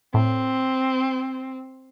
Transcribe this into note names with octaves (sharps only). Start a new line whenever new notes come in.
A2 C4